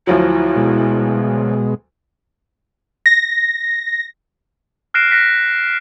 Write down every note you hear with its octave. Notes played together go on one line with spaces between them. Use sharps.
D2 F3 F#3 E4
B2 G#3
A#6
F6 F#6 A#6 C7 D7 E7
F#6 A#6 B6